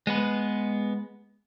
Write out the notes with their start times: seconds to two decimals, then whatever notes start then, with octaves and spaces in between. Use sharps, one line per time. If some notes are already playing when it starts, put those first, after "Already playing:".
0.07 G#3 B3 B4